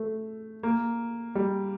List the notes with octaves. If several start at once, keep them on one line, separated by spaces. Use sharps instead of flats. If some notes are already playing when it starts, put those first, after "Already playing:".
Already playing: A3
A#3
G3